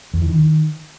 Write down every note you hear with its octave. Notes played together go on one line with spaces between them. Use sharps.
E2
E3
D#3